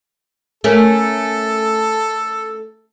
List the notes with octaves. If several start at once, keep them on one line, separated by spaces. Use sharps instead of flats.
A3 C#4 A4 A#4